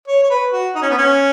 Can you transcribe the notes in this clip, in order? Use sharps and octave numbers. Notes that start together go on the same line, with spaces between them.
C#5
C#5
B4
F#4
D#4
C#4
B3
C#4